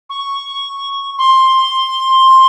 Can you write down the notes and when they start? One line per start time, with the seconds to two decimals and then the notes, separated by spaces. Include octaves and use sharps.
0.10 C#6
1.19 C6